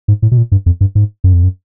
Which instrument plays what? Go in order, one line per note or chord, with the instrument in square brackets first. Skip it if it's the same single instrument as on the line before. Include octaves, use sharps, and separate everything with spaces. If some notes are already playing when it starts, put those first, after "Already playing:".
[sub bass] G#2
A2
B2
A#2
G2
F2
G2
G#2
F#2
F2
F#2